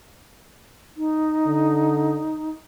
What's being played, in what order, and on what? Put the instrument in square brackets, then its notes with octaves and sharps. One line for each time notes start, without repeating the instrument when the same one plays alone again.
[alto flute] D#4
[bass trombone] D3